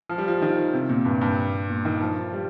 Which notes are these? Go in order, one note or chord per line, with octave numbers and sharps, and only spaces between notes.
F3
G3
F3
D#3
C3
A#2
G2
G2
A#2
D#3
F3
G3